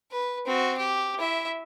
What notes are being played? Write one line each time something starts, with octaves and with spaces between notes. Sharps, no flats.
B4
C4 F#4
G4
E4 E5